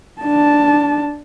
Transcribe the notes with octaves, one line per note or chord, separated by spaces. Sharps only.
D4 A5